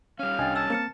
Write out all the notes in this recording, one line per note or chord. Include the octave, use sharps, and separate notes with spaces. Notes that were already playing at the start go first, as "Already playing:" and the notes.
G3 C#4 F5
C2 D4 D#5 G5 G#5 A6
A5 E6 F6 G#6
A#3 C4 F6 C#7 E7